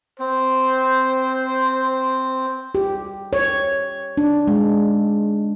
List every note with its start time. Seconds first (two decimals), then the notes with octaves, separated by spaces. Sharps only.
0.19 C4 C5
2.75 G4
3.33 C#5
4.17 D4
4.47 G#3